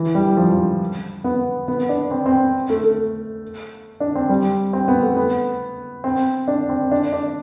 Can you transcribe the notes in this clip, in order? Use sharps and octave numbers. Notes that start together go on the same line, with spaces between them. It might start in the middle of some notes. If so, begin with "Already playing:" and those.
Already playing: E3
G3
F3
F3
B3
B3
D4
C4
C4
A3
A3
D4
C4
G3
C4
B3
A3
B3
C4
D4
C4
D4
D4